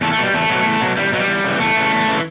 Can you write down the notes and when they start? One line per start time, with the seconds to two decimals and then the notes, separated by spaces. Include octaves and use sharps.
0.01 E2 A3
0.12 A3
0.18 B2 F#3
0.23 G3
0.33 E2 A3
0.50 B2 F#3
0.65 E2
0.81 B2 F#3
0.97 E2 G3
1.12 B2 F#3
1.20 G3
1.28 E2
1.44 C#3 E3
1.60 E2 A3
1.76 C#3 E3
1.92 E2
2.07 C#3 E3